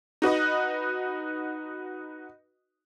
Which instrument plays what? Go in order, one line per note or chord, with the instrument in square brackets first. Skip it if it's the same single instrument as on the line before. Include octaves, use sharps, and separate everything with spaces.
[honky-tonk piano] D#4 F#4 B4 D#5